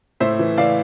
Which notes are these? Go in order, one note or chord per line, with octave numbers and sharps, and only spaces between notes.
A2 C5 E5
E3
E3 D5 F5